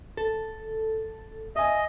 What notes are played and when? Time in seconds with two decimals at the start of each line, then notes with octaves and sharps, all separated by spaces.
0.17 A4
1.56 D#5 E5 G#5